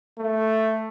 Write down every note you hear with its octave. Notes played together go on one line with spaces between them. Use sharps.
A3